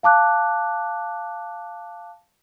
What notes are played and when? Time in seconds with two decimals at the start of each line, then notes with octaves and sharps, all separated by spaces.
0.03 F5 A5 D6 F#6